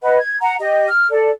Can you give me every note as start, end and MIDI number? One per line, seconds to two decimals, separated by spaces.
0.03 0.18 71
0.03 0.18 75
0.03 0.18 78
0.19 0.38 92
0.41 0.56 78
0.41 0.56 82
0.60 0.88 67
0.60 0.88 75
0.88 1.07 89
1.10 1.30 69
1.10 1.30 74